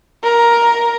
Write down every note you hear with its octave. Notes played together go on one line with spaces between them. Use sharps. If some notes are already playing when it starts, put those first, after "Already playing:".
A#4